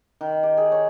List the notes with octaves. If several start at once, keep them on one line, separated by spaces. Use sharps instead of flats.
D#3
G4
G#4
C#5